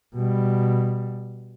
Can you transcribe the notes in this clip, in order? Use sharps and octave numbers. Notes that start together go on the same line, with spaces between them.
B2 G3